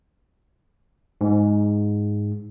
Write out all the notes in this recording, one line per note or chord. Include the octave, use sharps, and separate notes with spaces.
G#2